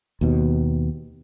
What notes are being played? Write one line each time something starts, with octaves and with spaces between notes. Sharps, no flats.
D#2 B2